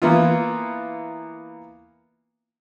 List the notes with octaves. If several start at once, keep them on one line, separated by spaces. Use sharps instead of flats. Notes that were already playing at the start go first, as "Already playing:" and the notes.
E3 A#3 B3 E4 F4